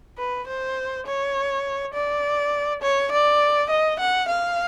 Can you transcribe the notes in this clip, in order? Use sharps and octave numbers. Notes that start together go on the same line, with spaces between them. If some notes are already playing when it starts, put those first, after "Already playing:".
B4
C5
C#5
D5
C#5
D5
D#5
F#5
F5